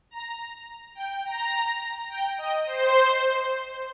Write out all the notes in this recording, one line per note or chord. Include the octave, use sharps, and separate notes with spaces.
A#5
G5
A#5
G5
D#5
C5